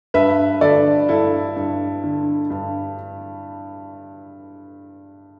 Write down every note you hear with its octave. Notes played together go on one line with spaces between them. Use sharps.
G2 B4 E5
D3 A4 D5
G2 E4 A4
G2
D3
G2